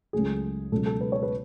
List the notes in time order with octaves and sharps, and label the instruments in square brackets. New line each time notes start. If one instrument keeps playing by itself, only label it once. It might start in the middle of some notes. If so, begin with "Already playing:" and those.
[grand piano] C#2 C#3 F#3 A3 G#4
C#2 B2 F#3 C#4 A4
A4
B4
C#5
B4